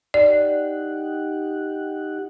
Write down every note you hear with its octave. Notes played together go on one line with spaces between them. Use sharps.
D#4 G4 D5 F#5